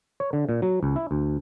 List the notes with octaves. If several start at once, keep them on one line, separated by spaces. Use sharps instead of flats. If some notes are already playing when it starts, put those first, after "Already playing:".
C#5
D3
A#2
F#3
C#2
E4
D2